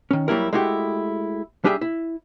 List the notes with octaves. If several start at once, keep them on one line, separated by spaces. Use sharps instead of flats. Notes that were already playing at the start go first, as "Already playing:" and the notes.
D#3 C#4
F#3 G3 A#3 E4 A#4
G#3 A3 E4 F#4 G4
G3 D4 G4 G#4 E5
E4